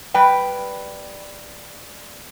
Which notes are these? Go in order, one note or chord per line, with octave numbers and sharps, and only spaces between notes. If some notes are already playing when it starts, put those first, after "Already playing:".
G3 B4 G5